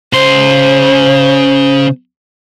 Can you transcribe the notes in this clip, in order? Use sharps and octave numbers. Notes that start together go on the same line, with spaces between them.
C#3 C5 C6